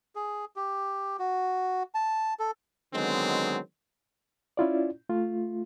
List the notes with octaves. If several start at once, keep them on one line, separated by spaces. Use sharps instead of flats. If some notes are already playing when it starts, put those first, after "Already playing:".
G#4
G4
F#4
A5
A4
D3 D#3 F#3 G#3 B3 C4
C#4 E4 F4 D5
A3 F4